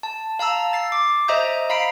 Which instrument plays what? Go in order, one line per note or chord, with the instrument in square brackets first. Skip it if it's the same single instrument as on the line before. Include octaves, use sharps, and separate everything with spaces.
[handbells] A5
F5 A5 A#5 E6
A6 C7
D6
C5 D#5 E5 A#5 D#6 G6
F5 A#5 B5 B6 C7 D7